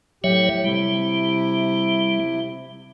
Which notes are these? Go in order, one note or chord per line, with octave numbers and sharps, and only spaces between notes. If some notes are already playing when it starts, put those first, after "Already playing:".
A2 F#3 G4 C#5 E5
C3 G3 E4